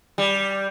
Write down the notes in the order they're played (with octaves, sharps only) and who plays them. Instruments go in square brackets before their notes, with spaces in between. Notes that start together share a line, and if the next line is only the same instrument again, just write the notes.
[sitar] G3